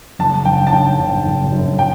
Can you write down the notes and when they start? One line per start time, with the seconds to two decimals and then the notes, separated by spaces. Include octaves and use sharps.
0.19 F#1 A5
0.45 F#1 G5
0.67 A5
0.72 F#1 G5
0.99 F#1
1.26 F#1
1.52 F#2
1.79 G5